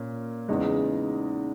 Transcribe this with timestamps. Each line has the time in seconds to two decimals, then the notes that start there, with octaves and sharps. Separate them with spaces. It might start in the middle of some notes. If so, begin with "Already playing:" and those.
Already playing: A#2 A#3 C#4
0.49 E2 C#3 G#3 D#4